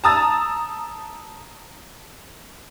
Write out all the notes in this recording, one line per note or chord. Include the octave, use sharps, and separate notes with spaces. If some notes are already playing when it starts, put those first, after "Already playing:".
A5 A#5 D#6 E6 A6